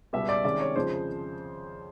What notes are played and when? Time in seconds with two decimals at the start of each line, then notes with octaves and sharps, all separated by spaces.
0.13 C#2 B2 G3 B3 E5
0.29 D5
0.44 C3 D#3 G#3 C#4 D5
0.60 C#5
0.76 F2 C#3 F3 G#3 C5